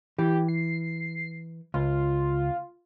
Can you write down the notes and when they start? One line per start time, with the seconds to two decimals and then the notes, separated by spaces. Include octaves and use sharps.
0.18 E3 G4
0.48 C7
1.74 C#2 F4